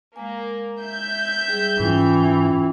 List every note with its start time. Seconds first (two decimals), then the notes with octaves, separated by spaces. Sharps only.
0.16 G#3 A#3 G#5
0.79 E5 G6
1.49 G3 G#4
1.80 G#2 E3 C#4 F4 G5